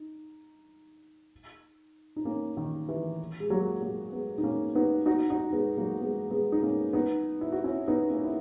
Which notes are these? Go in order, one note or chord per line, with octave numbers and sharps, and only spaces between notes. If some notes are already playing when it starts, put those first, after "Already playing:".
Already playing: D#4
D#4
A#3 C#4
D#3
E3
G#3
F#3 A#3
F#3 A#3
G#3 B3
D#4
A#3 C#4
B3 D#4
D#4 F#4
D#4 F#4
G#3 B3
F#3 A#3
G#3 B3
G#3 B3
D#4
A#3 C#4
B3 D#4
E4
F#4
C#4 E4
B3 D#4
A#3 C#4
E4